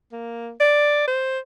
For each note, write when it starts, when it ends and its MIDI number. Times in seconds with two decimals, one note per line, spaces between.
0.12 0.51 58
0.60 1.05 74
1.08 1.39 72